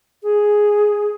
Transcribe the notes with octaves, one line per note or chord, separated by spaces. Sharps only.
G#4